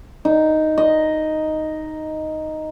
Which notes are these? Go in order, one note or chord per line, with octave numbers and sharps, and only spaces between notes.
D#4
D#5